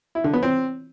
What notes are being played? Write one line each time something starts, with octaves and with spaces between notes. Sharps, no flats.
E4
D3
B3
C4